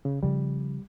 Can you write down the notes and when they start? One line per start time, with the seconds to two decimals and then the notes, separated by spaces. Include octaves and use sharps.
0.05 C#3
0.23 C#3 F3 G3